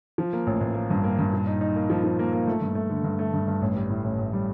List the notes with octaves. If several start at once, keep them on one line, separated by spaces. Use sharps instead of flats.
F3
A#3
A1
A1
A#3
G2
A#3
G2
A#2
D#4
D#4
A#3
F3
F3
A#3
A#3
A3
G2
A3
D3
G2
A3
G2
G2
A1
G3
A2
A1
A1
G3